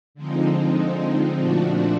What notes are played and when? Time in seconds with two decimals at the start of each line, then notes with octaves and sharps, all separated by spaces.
0.15 D3 F3 G#3 C4 D#4
1.38 A#2 F3 A3 D4 F#4